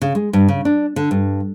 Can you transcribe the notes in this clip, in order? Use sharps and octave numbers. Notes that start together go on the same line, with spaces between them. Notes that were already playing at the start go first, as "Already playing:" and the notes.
C#3
G#3
G2
C#3
D4
D3
G2